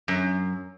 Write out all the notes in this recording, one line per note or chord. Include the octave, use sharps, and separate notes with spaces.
F#2